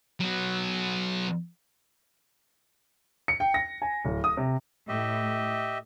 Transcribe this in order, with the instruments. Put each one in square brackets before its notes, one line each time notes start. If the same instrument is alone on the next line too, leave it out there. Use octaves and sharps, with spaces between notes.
[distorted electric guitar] F#3 B3
[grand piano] C#7
G5
A#6
G#5
D1
D#6
C3
[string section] A2 [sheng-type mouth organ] G4 D#5 E5